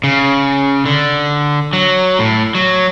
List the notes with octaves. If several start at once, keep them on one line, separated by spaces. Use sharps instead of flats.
C#3
D3
F#3
A2
F#3